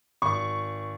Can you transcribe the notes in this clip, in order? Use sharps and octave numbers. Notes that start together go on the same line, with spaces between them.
G#1 C#6